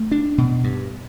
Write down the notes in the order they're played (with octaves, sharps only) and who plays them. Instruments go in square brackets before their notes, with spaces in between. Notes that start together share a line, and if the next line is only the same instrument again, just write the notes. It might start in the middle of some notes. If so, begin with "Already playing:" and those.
Already playing: [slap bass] A3
D4
B2
G2